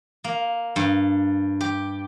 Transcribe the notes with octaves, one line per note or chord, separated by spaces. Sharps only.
A#3
G2
G4